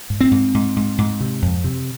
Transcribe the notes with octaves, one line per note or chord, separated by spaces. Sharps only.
G#2
C4
G#2
G#2
G#2
G#2
C3
F2
C3